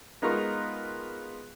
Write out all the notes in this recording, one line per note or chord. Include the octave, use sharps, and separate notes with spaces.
G#3 B3 D#4 F4 A#4 C#6